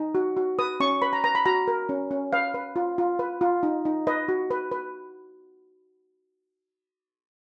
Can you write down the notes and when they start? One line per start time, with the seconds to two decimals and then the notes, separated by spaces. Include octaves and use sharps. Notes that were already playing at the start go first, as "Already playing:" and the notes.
Already playing: D#4
0.15 F#4
0.37 F#4
0.59 B4 D#6
0.80 C#4 C#6
1.02 B4 B5
1.13 A#5
1.24 B4 A#5
1.35 B5
1.46 F#4 A#5
1.68 A#4
1.89 C#4
2.11 C#4
2.33 B4 F5
2.54 B4
2.76 F4
2.98 F4
3.19 B4
3.41 F4
3.63 D#4
3.85 D#4
4.07 B4 D#5
4.28 F#4
4.51 B4
4.72 B4